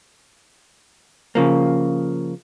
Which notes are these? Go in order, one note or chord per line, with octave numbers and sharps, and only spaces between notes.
C#3 F3 A#3